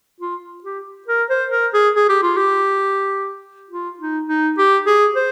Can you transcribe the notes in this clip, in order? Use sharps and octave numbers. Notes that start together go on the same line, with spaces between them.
F4
G4
A#4
C5
A#4
G#4
G#4
G4
F4
G4
F4
D#4
D#4
G4
G#4
C5